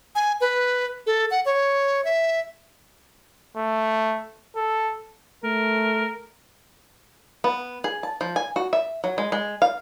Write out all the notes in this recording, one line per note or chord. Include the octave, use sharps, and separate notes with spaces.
G#5
B4
A4
F#5
C#5
E5
A3
A4
A3 A#4
B3
G#4
A5
F3
G#5
F#4
E5
F#3
G#3
G#3
F5